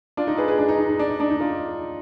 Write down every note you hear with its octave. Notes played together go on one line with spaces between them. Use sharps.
D4 F4
D#4
G#4 B4
G#4 B4
D4
D#4
D#4
D#4
D4
D#4
D4
D#4
D4 F4